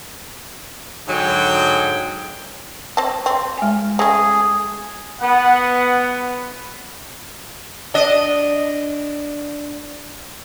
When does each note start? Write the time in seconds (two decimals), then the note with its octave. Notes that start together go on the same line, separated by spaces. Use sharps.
1.07 G#2 D3 F#3 G#4 G5
2.97 C4 A5
3.26 C4
3.58 G#3 G#5
3.99 C#3 A3 G#4 G#5
5.21 B3 F#5
7.94 D4 D#5